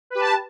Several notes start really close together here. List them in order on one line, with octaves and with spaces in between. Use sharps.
B4 G4 A5